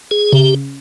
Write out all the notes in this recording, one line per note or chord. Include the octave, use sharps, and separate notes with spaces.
G#4
C#3 G4